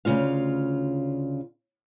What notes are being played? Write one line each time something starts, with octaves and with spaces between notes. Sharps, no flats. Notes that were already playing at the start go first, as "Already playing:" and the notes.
D2 C#3 F4 F5